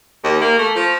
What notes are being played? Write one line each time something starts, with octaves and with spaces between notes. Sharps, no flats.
D#2
A#3
A3
F3